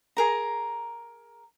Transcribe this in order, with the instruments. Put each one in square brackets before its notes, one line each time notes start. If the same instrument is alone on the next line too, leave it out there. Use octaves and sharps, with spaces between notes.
[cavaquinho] G#4 A#4 A#5